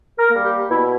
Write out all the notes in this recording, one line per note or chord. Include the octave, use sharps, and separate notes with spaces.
A#4
G3 A#3
G4
B2 E4